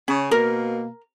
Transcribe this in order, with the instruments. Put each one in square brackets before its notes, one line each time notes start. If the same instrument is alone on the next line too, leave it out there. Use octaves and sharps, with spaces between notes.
[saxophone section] C#3 G#4 [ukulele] C#4
[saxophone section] B2 A#3 [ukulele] A#4